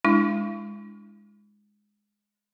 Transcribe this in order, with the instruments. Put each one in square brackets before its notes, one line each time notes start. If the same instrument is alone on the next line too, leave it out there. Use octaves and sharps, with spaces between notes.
[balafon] G#3 D4 E4